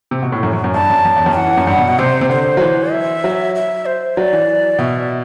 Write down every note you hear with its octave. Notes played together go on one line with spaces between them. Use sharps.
C3
B2
A2
F#2
F#2
F#2
G2 A5
F#2
F#2
E2
F#2
E3 F#5
E3
F#2
G2
B2
B2
C3 C5
C3
D3 C5
F#3
E3
E5
F#3
E5
C5
F#3 D5
E3
B2 E5